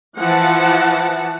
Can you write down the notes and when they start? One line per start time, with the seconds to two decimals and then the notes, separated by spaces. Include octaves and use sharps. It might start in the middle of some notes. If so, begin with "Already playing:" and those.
0.17 E3 F3 F#5 A5